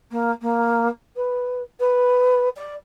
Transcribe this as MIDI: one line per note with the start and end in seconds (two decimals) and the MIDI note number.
0.11 0.31 58
0.41 0.88 58
1.16 1.62 71
1.79 2.48 71
2.56 2.74 74